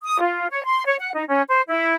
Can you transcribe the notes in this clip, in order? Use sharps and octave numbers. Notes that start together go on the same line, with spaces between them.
D#6
F4
C#5
C6
C#5
F#5
D#4
C#4
C5
E4